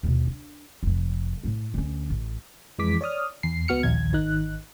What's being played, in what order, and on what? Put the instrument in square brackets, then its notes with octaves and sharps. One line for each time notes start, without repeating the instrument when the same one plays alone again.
[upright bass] D#2 B2
D4
F1 F2
A2 A3
D2 C#4
A1
[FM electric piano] F2 E3 G#3 D6 B6
C#5 D5 D#6 F6
E2 C7
C#2 B3 F#4 F6 C#7
A#1 D#2 G#6
G#1 D#3 D#4 F#6